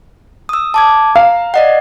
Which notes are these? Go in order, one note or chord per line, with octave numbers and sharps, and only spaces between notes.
D#6 E6
A5 D6 G#6
F5 A#5
D5 D#5 F#5